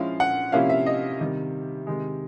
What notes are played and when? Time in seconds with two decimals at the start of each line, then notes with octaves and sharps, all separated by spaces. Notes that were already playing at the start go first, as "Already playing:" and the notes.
Already playing: F3 G#3 C#4 E4 F5
0.20 F#5
0.52 C3 F3 A#3 C#4 E4 F5
0.70 E5
0.86 D#5
1.20 C3 D#3 G3
1.87 C3 D#3 G#3